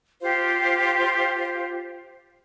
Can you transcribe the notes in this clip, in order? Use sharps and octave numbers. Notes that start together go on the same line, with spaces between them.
F4 G4 C5 F5